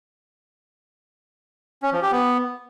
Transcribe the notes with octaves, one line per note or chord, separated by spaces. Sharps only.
C#4
F3
G4
B3